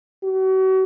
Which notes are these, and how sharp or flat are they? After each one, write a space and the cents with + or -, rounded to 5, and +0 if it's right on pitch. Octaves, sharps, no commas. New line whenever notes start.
F#4 +40